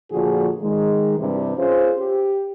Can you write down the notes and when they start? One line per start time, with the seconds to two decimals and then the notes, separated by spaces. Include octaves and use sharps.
0.12 A#2 D3 F3 F#4 G#4
0.62 D#3 G#3
1.19 G2 C3 E3 G3
1.58 C#4 F4 G#4 C5
1.99 G4